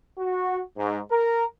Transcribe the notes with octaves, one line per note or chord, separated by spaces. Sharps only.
F#4
G#2
A#4